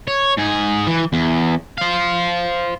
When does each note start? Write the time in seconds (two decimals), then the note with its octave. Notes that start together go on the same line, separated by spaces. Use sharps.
0.08 C#5
0.37 G#2 G#4
0.87 E3
1.13 E2
1.78 C5 F5